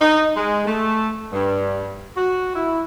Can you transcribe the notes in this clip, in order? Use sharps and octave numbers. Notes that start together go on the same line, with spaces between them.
D#4
G#3
A3
G2
F#4
E4